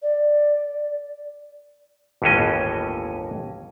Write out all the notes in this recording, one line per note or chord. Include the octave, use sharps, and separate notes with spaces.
D5
G1 D#2 A2 E3 C#4 D#5